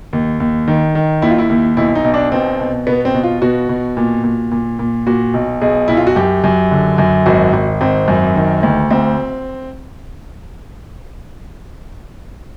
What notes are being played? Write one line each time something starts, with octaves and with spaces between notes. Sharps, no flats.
D#2
D#2
D#3
D#3
D#2 E4
F4
E4
D#2
B1 E4
D#4
B1
D4
B2 C4
B2
B2 B3
C4
B2
F4
B2 F#4
B2
A#2
A#2
A#2
A#2
A#2 F#4
B1
B1 G#4
B1 E4
F4
F#4
F#2 G4
F#2
D3
F#2
G#1 F#4
G#1
G#1 C4
F#2
D#3
D2
D2 C4